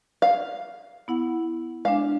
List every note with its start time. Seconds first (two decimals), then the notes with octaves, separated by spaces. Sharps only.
0.22 F5
1.08 B3 E4 F#5
1.85 G#3 D4 F5